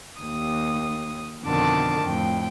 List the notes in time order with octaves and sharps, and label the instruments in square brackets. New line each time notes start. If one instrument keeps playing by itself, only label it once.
[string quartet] D#2 D#6
F2 B2 D3 D#3 A5 D6
F2 A2 G5